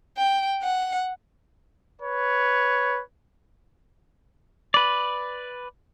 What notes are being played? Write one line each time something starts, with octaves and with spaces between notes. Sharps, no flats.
G5
F#5
B4 C#5
B4 D5